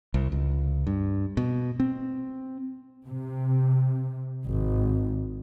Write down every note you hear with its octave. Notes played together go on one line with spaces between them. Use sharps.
C2
C#2
G2
B2
C4
C3
G#1